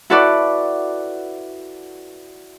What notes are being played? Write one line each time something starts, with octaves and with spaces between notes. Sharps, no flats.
E4 F#4 A4 B4 D5